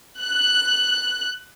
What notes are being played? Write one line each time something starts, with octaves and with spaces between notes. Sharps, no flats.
F#6